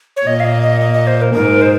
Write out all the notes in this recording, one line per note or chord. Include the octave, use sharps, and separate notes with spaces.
C#5
A#2 D#5
F5
D#5
D#5
D#5
D#5
C5
A#4
G#2 A#4
C5